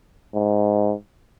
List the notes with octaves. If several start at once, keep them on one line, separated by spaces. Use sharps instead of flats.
G#2